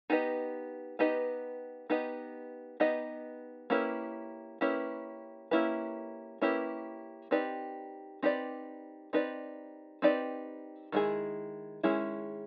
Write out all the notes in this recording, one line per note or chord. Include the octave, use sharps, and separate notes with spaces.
B3 D#4 G4 B4 D#5
B3 D#4 G4 B4 D#5
B3 D#4 G4 B4 D#5
B3 D#4 G4 B4 D#5
A#3 C#4 E4 G4 B4
A#3 C#4 E4 G4 B4
A#3 C#4 E4 G4 B4
A#3 C#4 E4 G4 B4
C4 D#4 G4 B4 D5
C4 D#4 G4 B4 D5
C4 D#4 G4 B4 D5
C4 D#4 G4 B4 D5
D#3 G#3 C#4 E4 G#4
D#3 G#3 C#4 E4 G#4